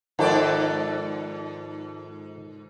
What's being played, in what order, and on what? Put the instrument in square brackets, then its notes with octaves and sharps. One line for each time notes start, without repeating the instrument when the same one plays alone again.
[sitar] G#2 A4 D5 [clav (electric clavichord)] D#3 F3 A5